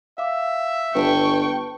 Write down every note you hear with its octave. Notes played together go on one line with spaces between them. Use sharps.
E5 F5 D6
G1 B4 G5 A5 C#6